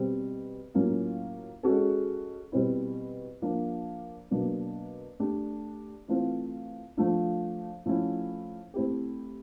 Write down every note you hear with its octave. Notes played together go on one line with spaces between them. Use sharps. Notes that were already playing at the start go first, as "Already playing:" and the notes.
Already playing: B2 G3 C4
A2 F#3 A#3 C#4 F4
G#3 C#4 F#4 A4
B2 G3 C4 E4
F3 A#3 D4 F4
B2 F#3 A#3 D4
A3 D4 G4
E3 A3 C4 F4
F3 A3 D4 F4
F3 A3 C#4 E4
A3 C4 E4 G4